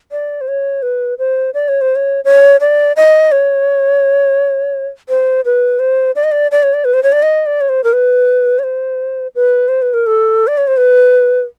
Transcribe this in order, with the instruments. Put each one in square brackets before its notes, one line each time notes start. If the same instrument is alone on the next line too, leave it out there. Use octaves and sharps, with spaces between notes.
[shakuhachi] D5
C5
C#5
B4
C5
D5
C#5
C5
C#5
C#5
D5
D#5
C#5
C5
B4
C5
D5
D#5
D5
D5
C#5
D5
B4
C5
C#5
D5
D#5
D5
C#5
C5
A#4
B4
C#5
C5
B4
C5
B4
A#4
A4
D5
C#5
C5
B4